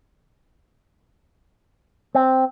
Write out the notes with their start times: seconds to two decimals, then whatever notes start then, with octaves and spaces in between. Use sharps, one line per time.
2.15 C4